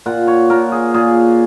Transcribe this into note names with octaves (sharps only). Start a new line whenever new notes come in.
A#2 F#5
C#5
A#2 A#4
G#4
A#2 G#4